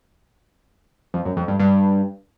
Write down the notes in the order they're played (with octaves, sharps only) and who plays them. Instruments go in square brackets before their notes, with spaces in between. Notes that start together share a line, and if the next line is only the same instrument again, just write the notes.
[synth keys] F2
F#2
F2
G2
G2